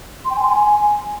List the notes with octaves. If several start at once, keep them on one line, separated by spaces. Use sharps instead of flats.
C6
G5
G#5
C6
G#5